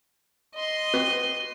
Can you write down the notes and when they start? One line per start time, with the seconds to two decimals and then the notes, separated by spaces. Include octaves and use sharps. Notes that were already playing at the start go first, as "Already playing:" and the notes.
0.54 D#5 C6
0.94 C4 F#4 B4